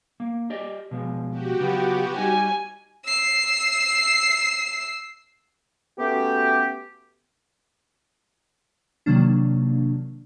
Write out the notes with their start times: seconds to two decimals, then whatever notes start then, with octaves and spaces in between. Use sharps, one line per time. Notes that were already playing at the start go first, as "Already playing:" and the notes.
0.20 A#3
0.50 G4 D5 D#5
0.91 B2 F3 G#3
1.30 F#4 G4
1.60 C#3 F#3 B3 F4
2.17 G3 D#4 G#5
3.05 E6 C7
5.98 A3 B3 C#4 F#4 G4
9.06 C3 D#3 F#3 A#3 D4